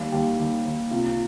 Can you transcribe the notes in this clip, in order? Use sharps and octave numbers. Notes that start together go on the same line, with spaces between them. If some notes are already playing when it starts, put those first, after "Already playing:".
Already playing: D#2 G3
D#2 G4
D#2
D#2
C3 F4